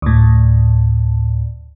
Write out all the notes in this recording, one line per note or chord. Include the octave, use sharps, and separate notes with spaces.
D2 A2